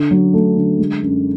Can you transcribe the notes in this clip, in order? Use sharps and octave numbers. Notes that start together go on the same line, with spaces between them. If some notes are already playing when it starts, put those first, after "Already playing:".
Already playing: D3
F#3
A3
D3
G#3
F#2